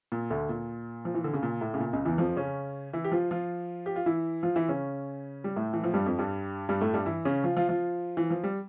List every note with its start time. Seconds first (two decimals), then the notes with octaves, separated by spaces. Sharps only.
0.12 A#2
0.30 D2 D3
0.49 A#2
1.05 F3
1.14 E3
1.24 D3
1.33 C#3
1.43 A#2
1.61 A2
1.74 C#3
1.80 A#2
1.93 C#2 C#3
2.05 E2 E3
2.18 F2 F3
2.36 C#3 C#4
2.93 E3 E4
3.04 G4
3.12 F3 F4
3.31 F3 F4
3.86 G4
3.96 F4
4.06 E3 E4
4.43 F3 F4
4.56 E3 E4
4.69 C#3 C#4
5.44 G3
5.56 A2 A3
5.73 E3
5.84 F3
5.94 G2 G3
6.06 F2 F3
6.19 G2 G3
6.69 G2 G3
6.81 A2 A3
6.94 G2 G3
7.06 E3 E4
7.25 C#3 C#4
7.44 F3 F4
7.57 F3 F4
7.69 F3 F4
8.17 E3
8.30 F3
8.44 G3